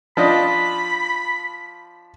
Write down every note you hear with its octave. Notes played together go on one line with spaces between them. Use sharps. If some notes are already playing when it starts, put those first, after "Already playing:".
F3 D4 D#5 B5